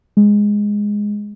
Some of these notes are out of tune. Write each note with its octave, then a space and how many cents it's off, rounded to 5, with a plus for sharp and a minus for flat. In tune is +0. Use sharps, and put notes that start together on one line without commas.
G#3 -5